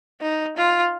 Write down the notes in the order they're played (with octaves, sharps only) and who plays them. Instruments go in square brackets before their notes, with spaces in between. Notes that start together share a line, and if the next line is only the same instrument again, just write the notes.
[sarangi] D#4
F4